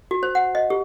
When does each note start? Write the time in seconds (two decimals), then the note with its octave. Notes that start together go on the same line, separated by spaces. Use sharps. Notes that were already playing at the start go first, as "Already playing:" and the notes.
0.11 F#4
0.23 C5
0.35 F#5
0.55 D#5
0.70 G4